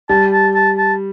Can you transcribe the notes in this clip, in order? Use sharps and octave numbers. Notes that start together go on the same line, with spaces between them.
G3 A5
A5
A5
A5